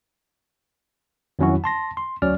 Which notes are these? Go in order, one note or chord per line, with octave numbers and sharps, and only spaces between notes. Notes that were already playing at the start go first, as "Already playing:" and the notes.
F2 D#3 F#3 C#4 E4 F#4
A5 C6 A#6
C6
D2 F#3 C#4 D5 F6